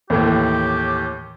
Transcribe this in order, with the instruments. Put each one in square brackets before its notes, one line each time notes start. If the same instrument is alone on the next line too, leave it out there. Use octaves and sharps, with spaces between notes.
[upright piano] D#2 A2 E3 [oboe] G4